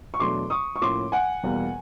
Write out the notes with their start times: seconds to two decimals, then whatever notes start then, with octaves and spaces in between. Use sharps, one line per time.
0.14 C#6
0.20 E2 B2 F#3 A3 D4 C6 D6
0.50 C#6 D#6
0.76 C#6
0.81 A2 F3 A#3 C#4 E4 C6 D6
1.12 F#5 G#5
1.43 E2 B2 G3 A#3